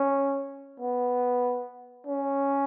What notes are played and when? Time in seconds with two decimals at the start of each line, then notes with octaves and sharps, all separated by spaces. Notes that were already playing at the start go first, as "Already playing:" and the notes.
Already playing: C#4
0.80 B3
2.07 C#4